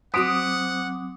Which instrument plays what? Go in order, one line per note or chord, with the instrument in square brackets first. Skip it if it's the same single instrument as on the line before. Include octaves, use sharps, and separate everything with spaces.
[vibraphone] F#3 C4 D6 [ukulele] F#4 C5 [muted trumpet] F#5 [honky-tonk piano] D#6 D7